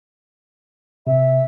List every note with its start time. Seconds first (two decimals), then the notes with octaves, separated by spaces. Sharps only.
1.07 C3 E5